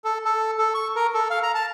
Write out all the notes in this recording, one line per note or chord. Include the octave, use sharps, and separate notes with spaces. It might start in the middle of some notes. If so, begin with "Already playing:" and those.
A4
A4
A4
C#6
A#4
A4
F5
A#5
A5